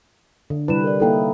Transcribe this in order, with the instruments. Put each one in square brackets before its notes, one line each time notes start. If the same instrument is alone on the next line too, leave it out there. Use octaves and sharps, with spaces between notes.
[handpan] D3
[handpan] C3 G3 B4 [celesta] E4 E7
[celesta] A#4 D5
[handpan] A#3 D#4 E4 [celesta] A4 G5